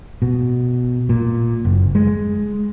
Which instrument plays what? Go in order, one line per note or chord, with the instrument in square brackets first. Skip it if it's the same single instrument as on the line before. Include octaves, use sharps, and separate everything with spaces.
[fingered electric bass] B2
A#2
F#1
G#3